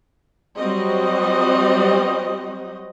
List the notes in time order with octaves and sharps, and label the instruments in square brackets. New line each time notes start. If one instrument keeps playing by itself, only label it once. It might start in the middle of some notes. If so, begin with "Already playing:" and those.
[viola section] F#3 G3 C4 F#4 G4 D#5